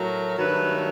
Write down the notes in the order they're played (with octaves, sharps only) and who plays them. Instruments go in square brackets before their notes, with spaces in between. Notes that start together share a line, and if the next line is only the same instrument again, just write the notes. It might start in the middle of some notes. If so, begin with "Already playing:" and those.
Already playing: [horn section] A2 F#3 A3 A#4
G2 D#3 F#3 A3 B4